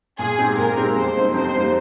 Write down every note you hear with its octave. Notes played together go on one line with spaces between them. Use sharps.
A#2 G#4
G#3 C4 D#4 G4
A#2 A#4
G#3 C4 D#4 G4
F2 C5
C3 G3 A#3 D#4
F2 C5
C3 G3 A#3 D#4